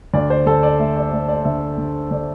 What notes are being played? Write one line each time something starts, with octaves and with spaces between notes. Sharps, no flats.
D2 D5
C5
D2 A4
D5
A3 E5
D5
A3 D5
D5
D3 E5
D3
D3 D5